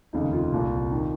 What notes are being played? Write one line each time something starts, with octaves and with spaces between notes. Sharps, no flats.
F1 D#2 C#3 D#4
F4
C2 A#2
D#3